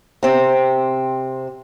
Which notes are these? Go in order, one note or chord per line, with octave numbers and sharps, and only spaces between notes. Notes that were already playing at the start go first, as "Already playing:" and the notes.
C3 C4